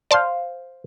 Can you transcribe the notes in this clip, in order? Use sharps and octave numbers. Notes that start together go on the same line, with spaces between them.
C5 D5 F5 A5 C6